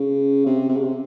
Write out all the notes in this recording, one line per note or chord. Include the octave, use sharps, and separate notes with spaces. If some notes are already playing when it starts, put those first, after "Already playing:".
Already playing: C#3
C3
C3
C#3
C3